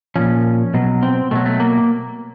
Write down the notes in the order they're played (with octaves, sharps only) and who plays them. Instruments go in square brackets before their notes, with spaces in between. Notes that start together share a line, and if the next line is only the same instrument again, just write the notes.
[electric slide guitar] A#2 F3 C#4
B2 F#3
C4
B2 F#3 A3
A3
A#3